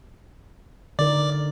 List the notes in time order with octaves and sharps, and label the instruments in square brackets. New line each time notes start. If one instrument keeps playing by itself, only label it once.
[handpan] D3 D#4 A#4 [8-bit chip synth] D5